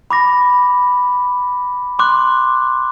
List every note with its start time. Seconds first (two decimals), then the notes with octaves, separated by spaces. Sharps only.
0.11 B5 D6 A#6
1.99 C6 D6 F#6